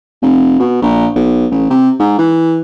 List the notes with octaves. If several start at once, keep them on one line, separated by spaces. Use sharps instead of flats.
F1
B2
A#1
B1
A1
C3
G#2
E3